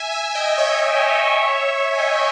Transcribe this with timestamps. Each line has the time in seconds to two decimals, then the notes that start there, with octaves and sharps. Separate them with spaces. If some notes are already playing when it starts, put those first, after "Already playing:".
Already playing: E5 G#5
0.12 E5 G#5
0.35 D#5 G5
0.48 G5
0.58 C#5 E5
1.93 G#5
1.98 D#5 G5